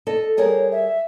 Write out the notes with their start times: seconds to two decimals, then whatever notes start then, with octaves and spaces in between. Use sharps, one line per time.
0.07 A4 D#5
0.37 G3 G#4 A#4 C#5
0.72 E5